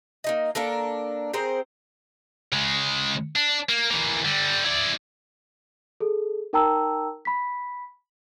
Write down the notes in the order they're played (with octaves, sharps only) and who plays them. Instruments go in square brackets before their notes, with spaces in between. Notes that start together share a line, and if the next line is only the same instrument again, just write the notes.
[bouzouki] A#3 D#4 D#5
A#3 D4 A4 A#4
C4 G#4 A#4 C5
[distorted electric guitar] C#3 G#3
D4
A#3
E3 A#3
D3 G3
E4 D5
[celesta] G#4 A4
D#4 A#4 G5 A5 A#5 E6
B5 B6